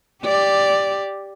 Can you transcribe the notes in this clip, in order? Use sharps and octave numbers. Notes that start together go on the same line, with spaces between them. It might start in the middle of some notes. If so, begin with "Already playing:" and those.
G4 D5